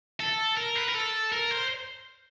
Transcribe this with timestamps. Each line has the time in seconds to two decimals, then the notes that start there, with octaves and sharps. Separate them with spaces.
0.20 A4
0.57 A#4
0.76 B4
0.89 A#4
0.95 A4
1.32 A#4
1.51 C5